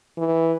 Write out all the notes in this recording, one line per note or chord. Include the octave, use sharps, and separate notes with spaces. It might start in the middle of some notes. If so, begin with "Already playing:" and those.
E3